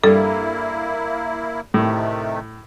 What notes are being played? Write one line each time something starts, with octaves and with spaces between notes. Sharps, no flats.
G2 A#3 E4 A4
A2 C3 D#3 A3